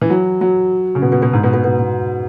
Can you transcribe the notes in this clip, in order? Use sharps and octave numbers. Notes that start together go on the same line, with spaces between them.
E3
F#3
F#3
C#3
B2
B2
B2
G#2
B2
B2
B2
B2